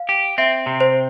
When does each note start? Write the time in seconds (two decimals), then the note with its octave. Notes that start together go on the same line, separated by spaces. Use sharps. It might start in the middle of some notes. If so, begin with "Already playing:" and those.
Already playing: F5
0.09 G4
0.38 C4 E5
0.66 C3
0.80 C5